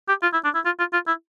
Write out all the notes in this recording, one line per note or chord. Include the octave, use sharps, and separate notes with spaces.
G4
F4
E4
D4
E4
F4
F4
F4
E4